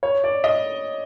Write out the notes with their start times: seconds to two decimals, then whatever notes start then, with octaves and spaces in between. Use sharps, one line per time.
0.03 C#5
0.24 D5
0.44 D#5